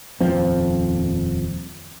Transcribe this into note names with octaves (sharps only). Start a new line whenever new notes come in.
D#1 F2 F3 C4